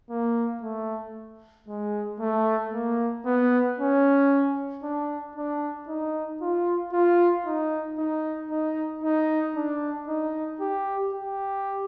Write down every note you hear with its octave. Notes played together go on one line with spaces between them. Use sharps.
A#3
A3
G#3
A3
A#3
B3
C#4
D4
D4
D#4
F4
F4
D#4
D#4
D#4
D#4
D4
D#4
G4
G4